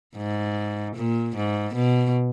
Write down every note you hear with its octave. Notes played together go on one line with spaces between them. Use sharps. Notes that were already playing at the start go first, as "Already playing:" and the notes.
G#2
A#2
G#2
B2